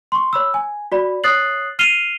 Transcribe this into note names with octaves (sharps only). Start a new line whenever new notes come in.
C6 C#6
C#5 B5 E6
G#5
F#4 D5 B5
C#5 D#6 F#6 A6 C7 F#7
F6 C7 D#7 F7 G7